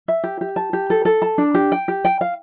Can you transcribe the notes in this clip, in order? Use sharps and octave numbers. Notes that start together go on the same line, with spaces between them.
E5
G4
G4
A5
G4
A4
A4
A5
D4
G4
G5
G4
G5
F5